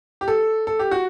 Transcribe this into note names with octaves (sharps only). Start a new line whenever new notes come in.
G4
A4
A4
G4
F#4